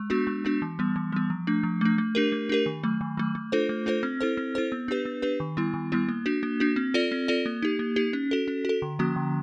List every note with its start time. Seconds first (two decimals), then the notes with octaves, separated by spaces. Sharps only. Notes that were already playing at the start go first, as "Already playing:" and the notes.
Already playing: G#3
0.10 B3 D4 F#4
0.27 G#3
0.45 B3 D4 F#4
0.62 E3
0.79 G3 B3
0.96 E3
1.12 G3 B3
1.30 F3
1.47 A3 D4
1.63 F3
1.81 A3 D4
1.98 A3
2.15 D4 G4 A#4
2.32 A3
2.49 D4 G4 A#4
2.66 D#3
2.83 F#3 A3
3.01 D#3
3.17 F#3 A3
3.35 A3
3.52 D4 F4 A4 C5
3.69 A3
3.86 D4 F4 A4 C5
4.03 C4
4.21 E4 A4 C5
4.37 C4
4.55 E4 A4 C5
4.72 B3
4.88 D4 G4 B4
5.05 B3
5.22 D4 G4 B4
5.40 D#3
5.57 G3 B3 E4
5.74 D#3
5.92 G3 B3 E4
6.09 A#3
6.26 D4 F#4
6.43 A#3
6.60 D4 F#4
6.76 C4
6.94 F4 A4 D5
7.12 C4
7.28 F4 A4 D5
7.46 A#3
7.63 D#4 G4
7.79 A#3
7.96 D#4 G4
8.13 C#4
8.31 F#4 A4
8.48 C#4
8.65 F#4 A4
8.82 D3
8.99 F3 A#3 C#4 F#4
9.16 D3